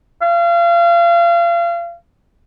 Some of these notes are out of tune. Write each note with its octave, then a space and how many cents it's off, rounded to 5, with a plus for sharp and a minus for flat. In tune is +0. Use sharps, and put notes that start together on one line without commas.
F5 -35